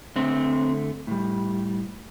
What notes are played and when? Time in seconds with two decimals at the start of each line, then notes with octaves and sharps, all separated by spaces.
0.16 D3 A3 C4
1.07 A2 G3